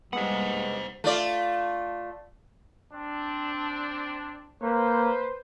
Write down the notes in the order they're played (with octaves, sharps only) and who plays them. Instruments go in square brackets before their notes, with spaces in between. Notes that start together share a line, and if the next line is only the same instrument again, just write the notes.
[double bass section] G3 A#3 [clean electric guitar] G#3 B3 [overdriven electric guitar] C5 F#5
[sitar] A3 F4 D5
[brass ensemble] C4 D4
[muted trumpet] A#3 [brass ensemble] B4 C5